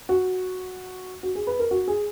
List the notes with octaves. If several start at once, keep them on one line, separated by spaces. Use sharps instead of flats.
F#4
F#4
G#4
B4
A#4
F#4
G#4